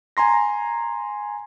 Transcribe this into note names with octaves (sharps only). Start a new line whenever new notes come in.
G#5 A#5 C6 A#6